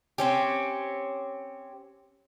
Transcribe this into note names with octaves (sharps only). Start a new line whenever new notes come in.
C4 C#4 G4